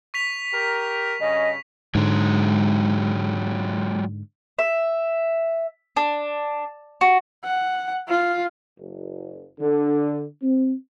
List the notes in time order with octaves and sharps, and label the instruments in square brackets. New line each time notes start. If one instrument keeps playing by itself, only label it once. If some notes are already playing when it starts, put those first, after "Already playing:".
[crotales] C#6 B6 F7
[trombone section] G4 A#4
[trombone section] G2 C#3 C#4 [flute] D#5
[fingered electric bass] G#2 D3 [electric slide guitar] F#3 G#3
[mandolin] E5
D4
F#4
[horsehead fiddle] F#5
F4
[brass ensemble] F#1
D3
C4